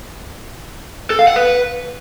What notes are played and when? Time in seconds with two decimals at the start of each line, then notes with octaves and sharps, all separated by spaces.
1.10 A4
1.19 F5
1.27 F#5
1.36 B4